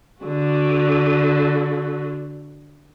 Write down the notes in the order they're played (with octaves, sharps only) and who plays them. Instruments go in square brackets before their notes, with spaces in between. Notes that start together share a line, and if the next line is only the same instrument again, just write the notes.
[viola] D3 F#4